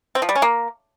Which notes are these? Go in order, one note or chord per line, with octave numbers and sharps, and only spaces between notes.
C4
F3
G3
C#4
A#3